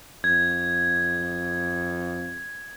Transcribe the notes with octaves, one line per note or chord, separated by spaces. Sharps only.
F2 G#6